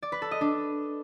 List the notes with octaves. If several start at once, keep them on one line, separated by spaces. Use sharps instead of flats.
D5
B4
A4
D#5
D4